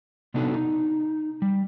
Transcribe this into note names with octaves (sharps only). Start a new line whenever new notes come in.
C3 B3 D4 D#4 F#4 A4
D#4
G3